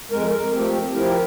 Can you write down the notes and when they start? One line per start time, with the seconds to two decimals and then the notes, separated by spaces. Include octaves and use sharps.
0.12 F2 G#3 A#4
0.30 A#4
0.53 F3 A3 C4 G4
0.94 F3 E4 G4 A#4